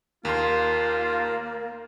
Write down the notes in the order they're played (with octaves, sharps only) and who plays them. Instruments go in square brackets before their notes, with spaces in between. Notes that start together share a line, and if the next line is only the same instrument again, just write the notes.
[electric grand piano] D#2 C6 [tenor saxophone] A#3 [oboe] F4